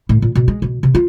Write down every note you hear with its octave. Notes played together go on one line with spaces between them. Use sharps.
A2
A#2
B2
G#3
B2
C3
F4